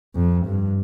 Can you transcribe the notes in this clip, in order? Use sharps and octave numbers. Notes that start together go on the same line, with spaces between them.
F2
G2